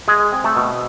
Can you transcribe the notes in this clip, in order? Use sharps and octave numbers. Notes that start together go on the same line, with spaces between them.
G#3 G#4
C4
A3 A4
B2